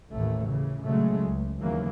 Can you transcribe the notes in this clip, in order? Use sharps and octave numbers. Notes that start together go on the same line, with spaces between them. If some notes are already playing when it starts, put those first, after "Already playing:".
A1 D#2 A2 A3
C#3 E3
A#2 C#3 F#3 G#3 A3
C#2
D#2 C#3 E3 F#3 A#3